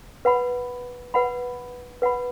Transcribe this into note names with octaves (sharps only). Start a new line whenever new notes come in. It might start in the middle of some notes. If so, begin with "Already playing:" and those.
B4 F#5 B5
B4 F#5 B5
B4 F#5 B5